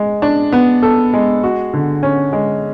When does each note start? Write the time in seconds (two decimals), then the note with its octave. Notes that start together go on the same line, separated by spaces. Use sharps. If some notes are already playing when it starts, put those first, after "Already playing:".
Already playing: G#3
0.22 D4
0.52 B3
0.83 A4
1.13 G#3
1.43 F#4
1.74 D3
2.03 C#4
2.33 G#3